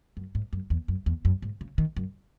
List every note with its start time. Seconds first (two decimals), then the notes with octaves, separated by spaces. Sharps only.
0.17 F#2
0.35 G#2
0.53 F#2
0.70 E2
0.88 F#2
1.06 E2
1.25 F#2
1.42 G#2
1.61 C#3
1.78 D#3
1.96 F#2